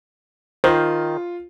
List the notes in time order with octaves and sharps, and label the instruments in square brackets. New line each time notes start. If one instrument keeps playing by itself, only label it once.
[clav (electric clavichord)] D#3 [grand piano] F4 [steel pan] C5